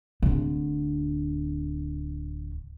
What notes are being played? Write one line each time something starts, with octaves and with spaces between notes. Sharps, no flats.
D1 D3